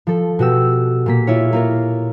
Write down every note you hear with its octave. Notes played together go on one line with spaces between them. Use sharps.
F3 A4
B2 F#4 G4 E6
A#2 A#3 B6
E4 F4 C#5
A#3 F4 A#4